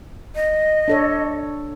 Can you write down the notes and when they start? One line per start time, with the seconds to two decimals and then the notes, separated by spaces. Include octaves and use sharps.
0.35 D#5
0.88 D4 A4 C#5